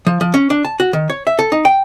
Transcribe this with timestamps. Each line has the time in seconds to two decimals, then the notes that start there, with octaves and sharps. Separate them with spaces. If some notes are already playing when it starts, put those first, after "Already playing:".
0.07 F3
0.21 F3
0.34 C#4
0.50 D4
0.65 A5
0.80 F#4
0.93 D#3
1.10 C#5
1.27 E5
1.39 A4
1.52 D#4
1.65 G5